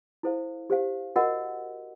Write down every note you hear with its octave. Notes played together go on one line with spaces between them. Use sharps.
E4 A4 C5 F5
G4 C5 F5
F#4 A#4 D#5 F#5